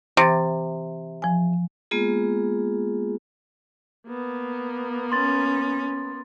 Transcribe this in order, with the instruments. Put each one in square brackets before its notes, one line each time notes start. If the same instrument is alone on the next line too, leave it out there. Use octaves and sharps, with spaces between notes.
[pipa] C3 [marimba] E3 A6
[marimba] F3 G#5
[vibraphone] G#3 A#3 B3 F4 G#4
[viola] A#3 B3
[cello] C#4 [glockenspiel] C6 A6